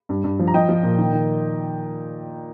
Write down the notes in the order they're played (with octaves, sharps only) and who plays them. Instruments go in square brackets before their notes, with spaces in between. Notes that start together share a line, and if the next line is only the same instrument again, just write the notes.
[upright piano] G2
G2
F3
A#5
F3 D#5 G5
F3
A#2
D#3
D#3